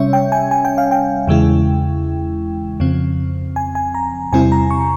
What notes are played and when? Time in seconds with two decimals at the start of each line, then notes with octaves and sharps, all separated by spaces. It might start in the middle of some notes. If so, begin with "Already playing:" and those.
Already playing: C3 G3 C#4 C#5 E5
0.13 G5
0.32 G#5
0.51 G#5
0.65 G5
0.78 F5
0.91 G5
1.28 E2 C#3 E3 G#3 E4
2.80 F2 C#3 F3 C4
3.56 G#5
3.75 G#5
3.95 A#5
4.32 E2 C3 G3 C4 E4 G#5
4.52 A#5
4.71 C#6